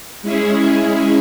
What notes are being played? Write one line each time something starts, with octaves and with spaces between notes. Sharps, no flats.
G#3 C#4 E4 G#4